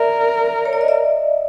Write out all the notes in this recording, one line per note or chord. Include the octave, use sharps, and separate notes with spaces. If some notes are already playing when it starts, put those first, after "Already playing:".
Already playing: A#4 D5 E5
C#5
D5
D#5
D5 E5